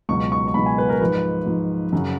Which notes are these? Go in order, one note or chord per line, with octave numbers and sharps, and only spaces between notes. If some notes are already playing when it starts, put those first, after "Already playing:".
C#2 B2 F#3 C#6
C#6
C#6
C#2 B2 F#3 B5
G#5
B4
A#4
G#2 F3 B4
G#2 F3
F#2 C#3 F#3